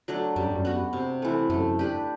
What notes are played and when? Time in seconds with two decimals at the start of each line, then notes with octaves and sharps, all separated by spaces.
0.08 F#3 A3 D4
0.36 F#2 G3
0.46 G2
0.55 F#2
0.65 B3 F#4
0.93 C3
1.22 E3 A3
1.50 F#2 A3
1.79 D4 G4 B4